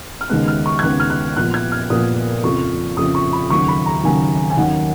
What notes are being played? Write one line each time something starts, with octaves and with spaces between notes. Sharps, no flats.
F6
D#2 C#3 G#3 B3 F#6
F6
C#6
G#6
D#2 C#3 G#3 B3 F#6
F6
F#6
A#2 F3 B3 F#6
G#6
F6
A#2 F3 B3 D#6
F2 C#3 F3 C#6
F2 C#3 F3 D#6
C#6
B5
D#2 C#3 F#3 C#6
B5
A#5
D#2 C#3 F#3 G#5
G#5
D#2 D#3 F#3 C#4 F#5